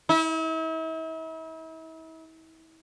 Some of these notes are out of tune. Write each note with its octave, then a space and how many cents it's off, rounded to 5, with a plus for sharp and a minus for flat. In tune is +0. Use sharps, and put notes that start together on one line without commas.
E4 -40